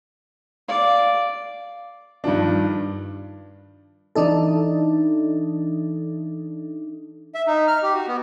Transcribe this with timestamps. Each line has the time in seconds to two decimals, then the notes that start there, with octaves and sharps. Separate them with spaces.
0.68 D5 F5
2.24 G2 D#3 F3 D4
4.15 E3 D4 D#4 A4
7.35 E5
7.47 D#4
7.68 F6
7.82 G4
7.94 F#4
8.08 B3